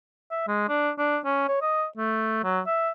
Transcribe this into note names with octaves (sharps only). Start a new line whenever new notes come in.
E5
G#3
D4
D4
C#4
C#5
D#5
A3
F#3
E5